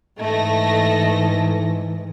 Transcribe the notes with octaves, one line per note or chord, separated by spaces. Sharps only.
G#2 E3 A3 D#5 A#6